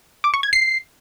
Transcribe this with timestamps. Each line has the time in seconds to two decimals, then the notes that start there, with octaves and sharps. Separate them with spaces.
0.24 D6
0.34 C#6
0.43 G#6
0.53 C7